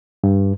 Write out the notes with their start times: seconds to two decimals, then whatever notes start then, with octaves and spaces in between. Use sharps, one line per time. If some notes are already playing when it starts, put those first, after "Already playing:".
0.24 G2